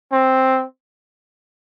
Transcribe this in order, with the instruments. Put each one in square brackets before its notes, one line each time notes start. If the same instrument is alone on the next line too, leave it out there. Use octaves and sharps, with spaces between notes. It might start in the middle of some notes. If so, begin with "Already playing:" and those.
[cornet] C4